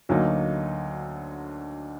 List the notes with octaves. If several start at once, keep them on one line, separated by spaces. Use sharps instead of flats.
D2 D3 F#3 A#3 D#4